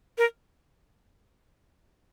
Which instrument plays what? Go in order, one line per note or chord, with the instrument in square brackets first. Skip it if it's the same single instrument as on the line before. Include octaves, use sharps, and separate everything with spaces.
[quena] A#4